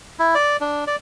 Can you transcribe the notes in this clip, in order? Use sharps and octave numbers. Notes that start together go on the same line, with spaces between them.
E4
D5
D4
D5